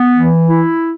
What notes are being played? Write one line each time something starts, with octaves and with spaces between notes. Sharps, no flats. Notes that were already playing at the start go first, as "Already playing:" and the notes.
Already playing: B3
E3
E4